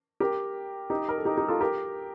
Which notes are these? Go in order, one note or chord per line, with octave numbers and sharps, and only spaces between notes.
G4 A#4
D#4 G4
A#4
A4
D#4 G4
D#4 G4
F4 A4
G4 A#4